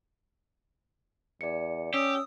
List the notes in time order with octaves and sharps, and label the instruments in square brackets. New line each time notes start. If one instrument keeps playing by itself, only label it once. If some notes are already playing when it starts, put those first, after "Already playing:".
[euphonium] E2 [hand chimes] D5 C#7
[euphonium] C#4 [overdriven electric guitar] G4 [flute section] D#6 E6